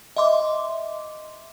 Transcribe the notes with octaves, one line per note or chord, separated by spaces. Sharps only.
D#5 E5 C6 D6